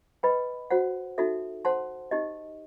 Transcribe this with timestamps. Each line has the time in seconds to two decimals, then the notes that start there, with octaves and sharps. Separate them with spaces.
0.23 B4 D#5 G5 B5
0.71 F#4 C5 F#5
1.18 D#4 F#4 A4 E5
1.65 C5 F#5 A5 C6
2.11 D#4 G4 D#5